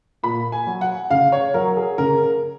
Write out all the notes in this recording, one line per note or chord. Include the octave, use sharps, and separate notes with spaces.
A#2 B5
G#5
F#3
F#5
C#3 F5
C#5
F#3 A#4
G#4
C#3 A#4